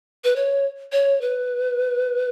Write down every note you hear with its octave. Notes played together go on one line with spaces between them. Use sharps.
B4
C#5
C#5
B4